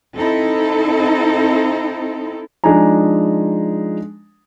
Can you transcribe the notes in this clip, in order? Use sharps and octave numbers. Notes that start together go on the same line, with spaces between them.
C4 D#4 E4 A4
F3 G#3 D4 D#4 G#5 A#5